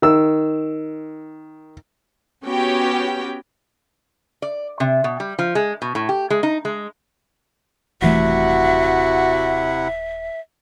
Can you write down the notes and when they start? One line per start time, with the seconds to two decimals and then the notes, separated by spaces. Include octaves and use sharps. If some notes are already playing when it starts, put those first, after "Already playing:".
0.02 D#3 E6
2.45 B3 C#4 F#4 G4 G5
4.42 D5
4.80 C3
5.04 B2
5.20 G3
5.39 F3
5.55 G#3
5.82 B2
5.95 A2
6.09 G4
6.30 G#3
6.43 D#4
6.65 G#3
8.02 D#1 C3 E3 A3 E4 F#4 E5 F#5